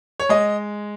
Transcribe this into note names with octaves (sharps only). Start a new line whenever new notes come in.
C#5
G#3 D#5